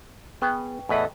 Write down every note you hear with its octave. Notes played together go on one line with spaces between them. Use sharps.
B3 G#4 B4 G5 C#6
E2 A2 A4 B4 D#5 E5